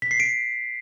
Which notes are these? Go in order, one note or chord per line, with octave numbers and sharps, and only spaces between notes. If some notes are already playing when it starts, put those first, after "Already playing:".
B6
C7
D7